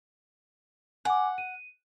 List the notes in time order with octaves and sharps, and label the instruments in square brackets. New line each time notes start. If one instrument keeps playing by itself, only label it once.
[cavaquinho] F#5 [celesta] G#5 D6
[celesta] D#7